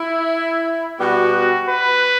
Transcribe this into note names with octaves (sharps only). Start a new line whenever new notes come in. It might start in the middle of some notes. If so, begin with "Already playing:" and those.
Already playing: E4
B2 G3 B3 F#4
B4